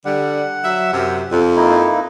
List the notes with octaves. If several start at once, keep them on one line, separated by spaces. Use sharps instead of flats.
D3 G3 F#5
F#3 E5
F#2 C3
F2
A#3 D#4 E4